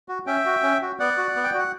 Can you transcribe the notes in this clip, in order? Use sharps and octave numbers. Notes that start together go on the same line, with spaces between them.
F#4
C#4 E5 G5
F#4
C#4
F#4
B3 D5 F#5
F#4
B3
G5
F#4 F#5